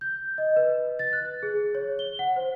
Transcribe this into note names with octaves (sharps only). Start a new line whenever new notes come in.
G6
D#5
B4
A6
F#6
G#4
C#5
G7
F#5
C5